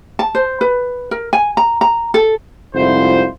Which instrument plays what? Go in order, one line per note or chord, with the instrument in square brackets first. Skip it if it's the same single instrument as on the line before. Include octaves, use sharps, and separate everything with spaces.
[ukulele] A5
C5
B4
A#4
G#5
A#5
A#5
A4
[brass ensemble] C2 F2 G#2 E4 F4 C5